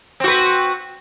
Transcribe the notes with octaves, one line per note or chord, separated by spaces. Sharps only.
C4 F#4 B4